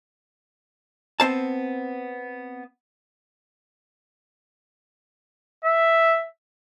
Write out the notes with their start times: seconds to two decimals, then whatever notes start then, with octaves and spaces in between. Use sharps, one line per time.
1.20 B3 C4 C5 A5
5.65 E5